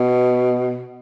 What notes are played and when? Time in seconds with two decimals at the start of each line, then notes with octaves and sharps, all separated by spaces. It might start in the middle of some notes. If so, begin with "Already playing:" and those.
Already playing: B2